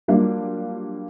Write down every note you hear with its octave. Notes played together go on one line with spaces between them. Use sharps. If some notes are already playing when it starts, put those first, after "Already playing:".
F#3 G3 A#3 D4 F4